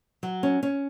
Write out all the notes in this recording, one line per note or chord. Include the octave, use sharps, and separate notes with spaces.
F#3
C#4
C#4